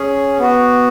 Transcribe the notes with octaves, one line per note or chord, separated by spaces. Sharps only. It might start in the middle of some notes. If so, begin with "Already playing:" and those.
Already playing: C#4 G#4
B3 F#4